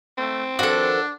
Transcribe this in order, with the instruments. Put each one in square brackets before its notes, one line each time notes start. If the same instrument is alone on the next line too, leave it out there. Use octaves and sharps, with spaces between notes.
[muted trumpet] A3 [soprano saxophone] C4
[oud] D#3 F3 B3 [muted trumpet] D4 [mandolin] F#4 A4